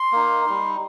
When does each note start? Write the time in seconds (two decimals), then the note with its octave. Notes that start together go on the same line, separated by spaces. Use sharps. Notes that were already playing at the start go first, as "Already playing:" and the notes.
Already playing: C6
0.12 A#3 D#4
0.46 G3 D#4